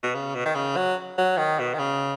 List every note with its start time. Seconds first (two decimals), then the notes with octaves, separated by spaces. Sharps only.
0.03 B2
0.15 C#3
0.35 B2
0.46 D#3
0.55 C#3
0.76 F#3
1.18 F#3
1.37 D#3
1.59 B2
1.74 D#3
1.79 C#3